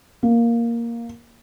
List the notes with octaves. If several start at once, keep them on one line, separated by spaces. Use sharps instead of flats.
A#3